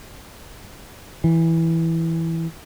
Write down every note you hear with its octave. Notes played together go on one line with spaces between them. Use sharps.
E3